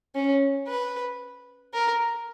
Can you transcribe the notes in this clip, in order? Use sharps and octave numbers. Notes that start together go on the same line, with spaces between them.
C#4
B4
A#4